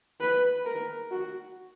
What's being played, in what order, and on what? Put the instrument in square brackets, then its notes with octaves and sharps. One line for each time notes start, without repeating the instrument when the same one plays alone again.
[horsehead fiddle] B4
A#4
F#4